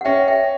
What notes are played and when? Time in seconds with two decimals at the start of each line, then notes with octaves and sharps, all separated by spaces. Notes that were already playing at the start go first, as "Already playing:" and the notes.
0.01 F#5
0.05 C#4 E5 G5
0.28 E5 G5